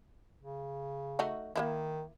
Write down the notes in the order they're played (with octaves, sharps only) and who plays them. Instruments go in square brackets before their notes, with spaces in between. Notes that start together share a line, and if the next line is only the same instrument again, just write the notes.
[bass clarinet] C#3
[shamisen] A3 D#4 F#4
[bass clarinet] D#3 [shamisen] A#3 D#4 E4